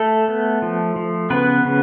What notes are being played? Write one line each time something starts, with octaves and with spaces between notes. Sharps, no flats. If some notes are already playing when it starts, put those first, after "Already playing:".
Already playing: A3 A4
B3
F3
F3
C#3 B3 B4
C#3